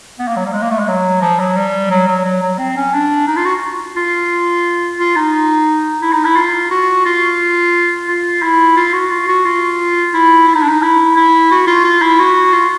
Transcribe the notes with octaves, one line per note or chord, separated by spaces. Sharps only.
B3
A#3
F#3
G3
G#3
A#3
A3
G#3
F#3
F3
F#3
G3
F#3
F#3
F#3
F#3
C4
C#4
D4
D#4
F4
F#4
F4
F4
D#4
E4
D#4
E4
F4
F#4
F4
F4
E4
F4
F#4
F4
F#4
F4
E4
E4
D#4
D4
D#4
E4
E4
F#4
F4
F4
E4
F#4
F4